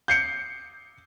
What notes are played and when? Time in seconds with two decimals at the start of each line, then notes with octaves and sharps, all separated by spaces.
0.08 G6 C7 C#7